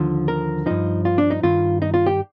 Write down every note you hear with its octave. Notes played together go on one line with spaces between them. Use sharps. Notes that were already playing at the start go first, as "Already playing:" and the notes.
Already playing: D#2 D3 F3
A#4
G2 F3 D#4
F4
D4
D#4
G2 D#3 F4
D#4
F4
G4